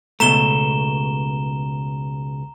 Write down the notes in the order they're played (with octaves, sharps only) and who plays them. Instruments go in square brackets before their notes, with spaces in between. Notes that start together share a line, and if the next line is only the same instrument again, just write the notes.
[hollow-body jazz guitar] C#2 B2 A3 [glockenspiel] A#5 E7 G7